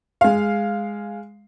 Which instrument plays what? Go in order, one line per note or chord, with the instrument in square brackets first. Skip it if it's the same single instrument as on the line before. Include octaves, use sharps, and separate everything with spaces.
[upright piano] G#3 F5